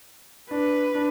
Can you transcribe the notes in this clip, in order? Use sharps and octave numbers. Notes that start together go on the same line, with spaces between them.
D4 B4
D4